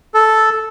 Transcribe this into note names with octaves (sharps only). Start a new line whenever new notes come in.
A4